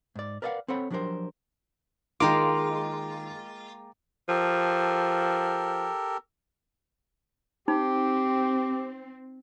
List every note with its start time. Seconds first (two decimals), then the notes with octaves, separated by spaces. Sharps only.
0.16 G#2 D5
0.42 A#4 B4 D5 D#5 F5 F#5
0.68 C4 A4 C5 C#5 F#5 B5
0.90 F3 F#3 D4 G4 A#4 C5
2.20 D#3 G#3 A#3 F4 G5 A#5 D6
4.29 F3 G4 A4 A#4
7.68 C4 D#4 G4